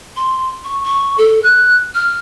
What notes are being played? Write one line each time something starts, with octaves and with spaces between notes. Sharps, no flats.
C6
C#6
C#6
A4
F#6
F6